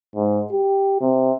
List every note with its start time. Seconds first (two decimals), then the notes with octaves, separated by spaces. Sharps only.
0.16 G#2
0.52 G4
1.01 C3